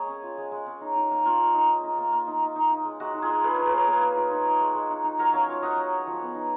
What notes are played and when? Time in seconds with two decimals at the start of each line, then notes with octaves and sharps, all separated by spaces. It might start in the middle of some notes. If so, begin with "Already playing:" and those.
Already playing: G#3 A#3 G#4 C#5
0.08 C#4
0.23 F4
0.38 G#3
0.52 G#3
0.66 C#4
0.81 D#4
0.96 D#4
1.11 A#3
1.25 A#3 F4
1.39 D#4
1.54 D#4
1.69 D#4
1.84 D#4
1.98 A#3
2.12 A#3
2.27 D#4
2.42 D#4
2.56 D#4
2.70 D#4
2.85 G#3
3.00 G#3 F#4
3.14 D#4
3.22 F4 G#4
3.29 D#4
3.43 F4 G#4 B4
3.54 F4 A#4 C#5
3.66 G#4 B4
3.73 A#3 A#4 C#5
3.87 A#3 G#4 B4
4.02 F4
4.17 F4
4.31 D#4
4.46 D#4
4.61 G#3
4.75 G#3
4.90 D#4
5.04 D#4
5.19 F#3 A#4 C#5
5.33 C#4 C#5 F5
5.48 F4
5.62 F#3 D#5 F#5
5.77 F#3
5.92 C#4
6.07 F3
6.21 B3
6.35 D#4